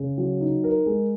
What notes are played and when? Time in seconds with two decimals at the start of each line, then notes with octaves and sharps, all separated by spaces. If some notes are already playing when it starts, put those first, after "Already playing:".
Already playing: C#3
0.18 F#3
0.41 D#4
0.64 A#4
0.86 G#3